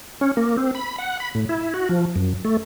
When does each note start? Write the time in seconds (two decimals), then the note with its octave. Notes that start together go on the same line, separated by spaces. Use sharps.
0.21 C#4
0.37 A#3
0.57 C4
0.75 B5
0.98 F#5
1.20 B5
1.35 A2
1.49 E4
1.74 F#4
1.89 F3
2.16 F#2
2.45 A3